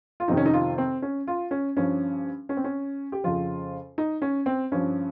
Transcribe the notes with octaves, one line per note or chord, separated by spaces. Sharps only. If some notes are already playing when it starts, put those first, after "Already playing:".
F4
F2 C3 D#3 D#4
C#4
D#4
F4
C4
C#4
F4
C#4
G2 F3 C#4
C#4
C4
C#4
G4
F2 C#3 F3 F4
D#4
C#4
C4
G2 F3 C#4